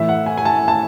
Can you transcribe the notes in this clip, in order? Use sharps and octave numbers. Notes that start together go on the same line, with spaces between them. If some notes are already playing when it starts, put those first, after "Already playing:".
Already playing: A2 E3 E5
F#5
G#5
G#5
A5
A5